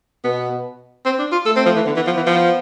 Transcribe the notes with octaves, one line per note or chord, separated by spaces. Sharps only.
B2 B3
C4
D4
F4
A3 A4
C4
F3
E3
D3 B3
E3
F3
E3
F3